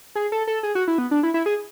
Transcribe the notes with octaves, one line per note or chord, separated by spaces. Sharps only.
G#4
A4
A4
G#4
F#4
E4
B3
D4
E4
E4
G#4